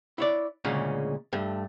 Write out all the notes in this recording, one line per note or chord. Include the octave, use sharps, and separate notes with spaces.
E4 C#5 D5
D2 A#2 C#3 G#3 C#4
G2 A3